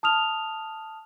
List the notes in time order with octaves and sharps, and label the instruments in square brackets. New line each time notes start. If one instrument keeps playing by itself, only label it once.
[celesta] A5 D#6 F6 F7